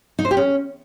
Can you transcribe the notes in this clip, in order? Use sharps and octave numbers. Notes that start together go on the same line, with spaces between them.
D#4
C5
G4
C#4